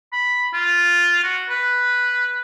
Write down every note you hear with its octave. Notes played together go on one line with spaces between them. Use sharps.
B5
F4
F#4
B4